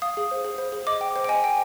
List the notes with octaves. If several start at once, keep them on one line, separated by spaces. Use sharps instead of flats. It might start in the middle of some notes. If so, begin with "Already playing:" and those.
F5 D#6
G#4
C5
G#4
C5
G#4
D#5 D6
G5
C5
G5
D#5 G#5
G5